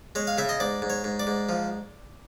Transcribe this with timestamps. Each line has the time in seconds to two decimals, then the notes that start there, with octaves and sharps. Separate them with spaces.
0.15 G#3 C#5
0.27 F5
0.38 C#3 E5
0.49 D#5
0.60 G#2 D5
0.82 G#2
0.90 C#5
1.04 G#2
1.19 D5
1.27 G#2
1.49 F3